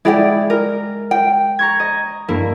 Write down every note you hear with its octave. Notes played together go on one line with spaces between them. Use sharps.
G#3 E4 G#4 D5 G5
A#4
G5
A#5 C#6 G#6
D#5
G2 A#3 E4